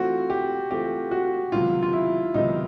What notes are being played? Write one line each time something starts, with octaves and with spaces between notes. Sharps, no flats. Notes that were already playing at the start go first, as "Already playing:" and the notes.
Already playing: E3 A3 C4 F4 F#4
G4
E3 A3 C4 F4 G4
F#4
C#2 C3 D#3 F#3 B3 F4
F4
E4
C#2 C3 D#3 F#3 B3 D#4